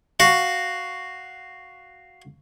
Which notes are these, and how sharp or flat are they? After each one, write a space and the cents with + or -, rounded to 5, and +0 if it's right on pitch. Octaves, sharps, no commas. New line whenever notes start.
F#4 +0 F5 +0